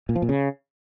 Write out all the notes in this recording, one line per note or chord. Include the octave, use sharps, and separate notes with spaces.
A#2
F3
A#2
C#3